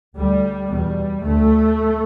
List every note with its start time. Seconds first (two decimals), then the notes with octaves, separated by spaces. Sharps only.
0.16 D2 G3
0.70 E2 B2 G3
1.24 D2 A3